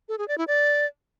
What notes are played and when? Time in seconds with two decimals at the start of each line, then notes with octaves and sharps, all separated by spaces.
0.09 A4
0.18 G#4
0.28 D5
0.38 E4
0.48 D5